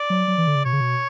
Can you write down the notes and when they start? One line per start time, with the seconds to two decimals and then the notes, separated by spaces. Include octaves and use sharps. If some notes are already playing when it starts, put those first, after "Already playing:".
Already playing: D5
0.10 F#3
0.28 F#3
0.38 E3
0.47 D3
0.55 C#3
0.65 B2 C#5
0.73 C#3
0.81 B2